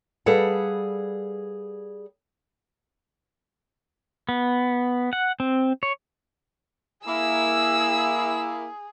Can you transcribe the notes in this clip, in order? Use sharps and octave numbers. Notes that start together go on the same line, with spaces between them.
G3 G#4 A4 B4 F5 F#5
B3
F#5
C4
C#5
A#3 E4 G#4 E6